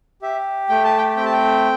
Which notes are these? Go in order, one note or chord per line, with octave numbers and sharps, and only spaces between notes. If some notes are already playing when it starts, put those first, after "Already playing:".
G4 E5
A3 G5
A5
G5
C4 G5
A5
G5